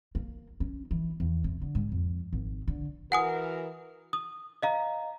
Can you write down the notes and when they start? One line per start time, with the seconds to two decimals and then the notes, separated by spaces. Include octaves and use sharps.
0.15 A#3
0.60 C#4
0.91 E3
1.20 E2
1.44 C3
1.62 D3
1.75 G#2
1.92 F2
2.33 G#1
2.68 D3
3.12 E3 F#4 A#4 F#5 G#5 D#6
4.13 D#6
4.63 D#5 F5 A#5